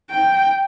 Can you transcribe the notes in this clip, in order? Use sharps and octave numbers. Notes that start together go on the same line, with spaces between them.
G5